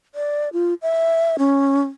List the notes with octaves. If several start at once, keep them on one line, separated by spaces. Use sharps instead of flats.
D5
F4
E5
C#4